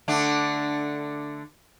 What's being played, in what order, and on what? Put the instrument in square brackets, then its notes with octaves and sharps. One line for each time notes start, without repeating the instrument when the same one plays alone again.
[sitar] D3 A3 D4